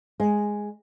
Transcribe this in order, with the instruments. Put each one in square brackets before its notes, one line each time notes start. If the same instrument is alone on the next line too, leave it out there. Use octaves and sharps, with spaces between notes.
[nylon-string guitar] G#3